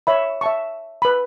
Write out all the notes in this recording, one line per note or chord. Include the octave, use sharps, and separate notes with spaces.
C#5 E5 B5
E5 A5 C#6
B4 B5